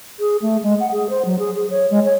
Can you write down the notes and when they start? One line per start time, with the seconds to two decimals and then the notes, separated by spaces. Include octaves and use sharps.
0.20 G#4
0.42 A3
0.63 G#3
0.80 F#5
0.92 G#4
1.10 C5
1.25 F#3
1.39 G#4
1.55 G#4
1.70 C#5
1.91 G#3
2.05 C#5